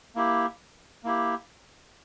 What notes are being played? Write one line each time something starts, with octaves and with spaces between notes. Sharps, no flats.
A#3 E4 G4
A#3 E4 G4